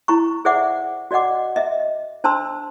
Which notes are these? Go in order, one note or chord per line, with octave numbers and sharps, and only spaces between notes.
E4 A#5 C#6
G#4 C5 D5 E5 F#5 D6
F#4 D5 D#5 F#5 D6
D#5 E5
D4 C5 A5 A#5 C6 E6